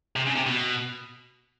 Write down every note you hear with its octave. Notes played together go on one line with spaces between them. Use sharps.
C3
C#3
C3
B2